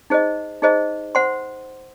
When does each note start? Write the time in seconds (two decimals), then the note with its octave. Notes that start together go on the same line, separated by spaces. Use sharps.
0.10 D#4 G#4 C5 D#5
0.62 D#4 G#4 C5 D#5
1.15 C5 F#5 C6